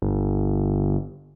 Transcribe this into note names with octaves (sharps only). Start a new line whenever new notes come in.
G1